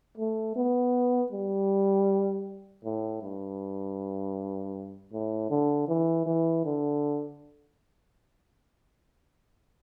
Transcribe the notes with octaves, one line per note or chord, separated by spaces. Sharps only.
A3
B3
G3
A2
G2
A2
D3
E3
E3
D3